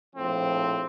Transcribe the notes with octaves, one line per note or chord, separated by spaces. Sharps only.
A#1 A2 F3 C4